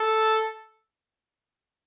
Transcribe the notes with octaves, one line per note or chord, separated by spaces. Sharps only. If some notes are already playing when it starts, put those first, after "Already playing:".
Already playing: A4